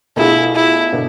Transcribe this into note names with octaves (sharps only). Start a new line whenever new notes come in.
B2 A3 D4 E4 F4 G#4
E4
B2 B3 D4 A4